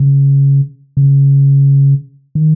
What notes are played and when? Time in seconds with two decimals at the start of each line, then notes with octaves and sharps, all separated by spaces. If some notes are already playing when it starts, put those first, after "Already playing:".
Already playing: C#3
0.97 C#3
2.35 D#3